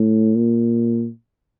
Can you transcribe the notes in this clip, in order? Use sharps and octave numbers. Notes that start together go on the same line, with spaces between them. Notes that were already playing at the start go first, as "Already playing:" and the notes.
Already playing: A2
A#2